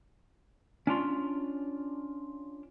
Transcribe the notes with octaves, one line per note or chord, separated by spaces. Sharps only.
C#4 D4 F4